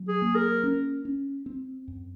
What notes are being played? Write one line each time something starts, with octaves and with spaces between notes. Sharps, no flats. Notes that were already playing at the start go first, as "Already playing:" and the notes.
Already playing: F#3
G#4
A#3
A#4
C#4
C#4
C4
F#2